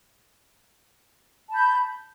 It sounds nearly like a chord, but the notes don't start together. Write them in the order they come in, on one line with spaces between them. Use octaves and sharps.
A5 B5 G6